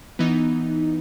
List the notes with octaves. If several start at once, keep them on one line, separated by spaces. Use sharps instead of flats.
E3 B3 D#4